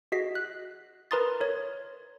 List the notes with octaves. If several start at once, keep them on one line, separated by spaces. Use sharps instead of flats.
F#4 G#4 D#5 B6 C7
F#6
A#4 B4 A#5 C6 D#6 A6
A#4 C#5